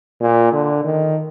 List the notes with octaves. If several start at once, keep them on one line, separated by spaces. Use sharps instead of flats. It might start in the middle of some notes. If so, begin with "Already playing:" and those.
A#2
D3
D#3